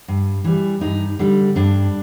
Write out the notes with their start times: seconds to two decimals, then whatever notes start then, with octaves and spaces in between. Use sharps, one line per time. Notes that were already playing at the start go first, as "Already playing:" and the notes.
0.08 G2
0.44 E3 G3
0.81 G2 D#4
1.19 D3 G3
1.56 G2 D4